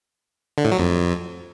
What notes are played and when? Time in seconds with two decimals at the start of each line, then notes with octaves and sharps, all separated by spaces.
0.58 D3
0.65 A2
0.72 F#3
0.79 F2